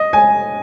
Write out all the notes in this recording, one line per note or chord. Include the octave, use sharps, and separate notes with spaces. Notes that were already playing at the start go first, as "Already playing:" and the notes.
Already playing: D#5
G#5